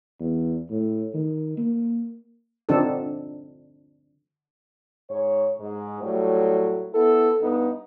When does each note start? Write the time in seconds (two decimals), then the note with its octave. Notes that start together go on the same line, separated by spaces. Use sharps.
0.20 E2
0.70 A2
1.14 D#3
1.57 A#3
2.69 D3 F3 C4 D4 D#4 A4
5.09 G#2 C#5
5.58 G#2
6.01 A2 F#3 G3 A3
6.94 B3 E4 A4
7.40 G2 B3 D#4